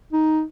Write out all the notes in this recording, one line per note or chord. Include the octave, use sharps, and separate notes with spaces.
D#4